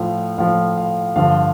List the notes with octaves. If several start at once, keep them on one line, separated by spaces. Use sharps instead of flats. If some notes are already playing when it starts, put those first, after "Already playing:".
Already playing: A2 F3 F5
A2 F3 F5
F5
G2 D3 F3 F5